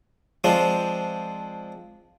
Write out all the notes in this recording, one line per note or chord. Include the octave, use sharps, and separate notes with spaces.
F3 G#3 C4 D4